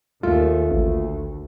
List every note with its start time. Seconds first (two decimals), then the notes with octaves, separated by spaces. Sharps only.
0.23 D#2 A3 F4
0.71 A1 D2